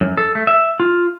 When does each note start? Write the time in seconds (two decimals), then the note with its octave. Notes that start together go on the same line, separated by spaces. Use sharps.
0.01 F#2
0.17 A4
0.35 A3
0.47 E5
0.80 F4